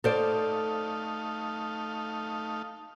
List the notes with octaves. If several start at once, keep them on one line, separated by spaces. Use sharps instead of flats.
A3 D#4 A4 C5 D5 F5